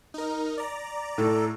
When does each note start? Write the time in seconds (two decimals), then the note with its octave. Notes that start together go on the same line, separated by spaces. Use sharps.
0.14 D#4 A#4
0.57 D5 A#5
1.18 A2 A4